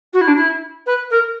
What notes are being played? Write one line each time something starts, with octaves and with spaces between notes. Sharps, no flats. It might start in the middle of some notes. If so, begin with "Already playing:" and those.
F#4
E4
D4
E4
B4
A#4